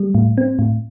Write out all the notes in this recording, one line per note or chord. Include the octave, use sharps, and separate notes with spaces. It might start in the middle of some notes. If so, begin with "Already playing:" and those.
Already playing: G3
A2
C4
A2